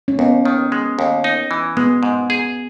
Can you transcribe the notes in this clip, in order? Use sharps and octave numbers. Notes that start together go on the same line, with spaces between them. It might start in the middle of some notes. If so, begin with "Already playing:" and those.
C#4
D#2 B3
D#3
G#3
D#2
D#4
E3
G#3 B3
G#2
G#4